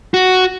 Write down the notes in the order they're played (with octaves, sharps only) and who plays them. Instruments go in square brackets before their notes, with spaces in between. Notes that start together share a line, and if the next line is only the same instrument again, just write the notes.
[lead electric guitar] F#4